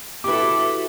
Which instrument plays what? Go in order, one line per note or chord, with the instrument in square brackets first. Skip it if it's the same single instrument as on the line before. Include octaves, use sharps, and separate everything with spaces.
[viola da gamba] E4 F#4 A4 [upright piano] G4 B4 [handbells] D6